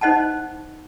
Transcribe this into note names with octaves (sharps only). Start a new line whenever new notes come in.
D#4 C5 D#5 F#5 A5